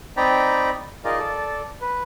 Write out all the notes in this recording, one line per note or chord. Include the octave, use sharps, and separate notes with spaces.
C4 D#4 D5 G5 A#5 B5
D#4 F4 G#4 A#4 D5 D#5
A4 D5
B4